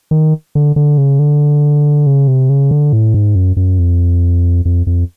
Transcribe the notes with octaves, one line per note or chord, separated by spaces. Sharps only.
D#3
D3
D3
C#3
D3
C#3
C3
C#3
D3
A2
G#2
F#2
F#2
F2
F2
F2